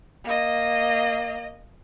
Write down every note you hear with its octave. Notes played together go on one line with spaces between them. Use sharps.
A#3 D#5